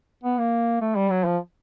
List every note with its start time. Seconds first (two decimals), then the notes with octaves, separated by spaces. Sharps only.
0.24 B3
0.38 A#3
0.81 A3
0.96 G3
1.11 F#3
1.25 F3